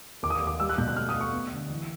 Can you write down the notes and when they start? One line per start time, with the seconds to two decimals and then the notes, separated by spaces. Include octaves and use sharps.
0.22 D#2 D6
0.30 D#6
0.35 D6
0.42 D#2
0.47 D6
0.60 G3 E6
0.69 F#6
0.78 B2 G6
0.88 F#6
0.96 A3 F6
1.09 D#6
1.15 A3
1.21 C#6
1.33 B3
1.52 D3
1.70 E3